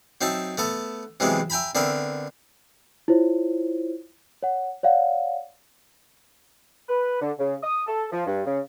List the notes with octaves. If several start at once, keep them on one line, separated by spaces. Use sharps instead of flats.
F#3 C4 D#4 E5 A5
A3 B3 A4
C3 E3 F#3 G#3 B3 C4
E5 G5 G#5 A#5 B5
D3 B3 C4 A#4 E5 B5
E4 F4 C5 C#5
C#5 F#5
C#5 D5 F5 F#5
B4
D3
C#3
D#6
A4
F3
G2
C#3